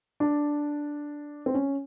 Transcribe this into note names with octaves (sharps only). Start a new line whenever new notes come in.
D4
C4
C#4